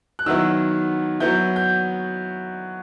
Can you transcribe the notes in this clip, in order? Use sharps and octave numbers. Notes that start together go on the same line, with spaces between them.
F#6
D#3 F#3 B3 E4 E6
F#3 B3 E4 G6
G6